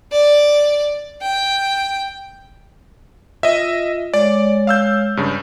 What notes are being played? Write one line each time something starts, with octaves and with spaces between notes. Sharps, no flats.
D5
G5
F4 D#5 E5
G#3 C#5 D5
F5 E6 G6
G2 C#3